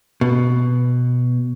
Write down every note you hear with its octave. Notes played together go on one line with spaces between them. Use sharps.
B2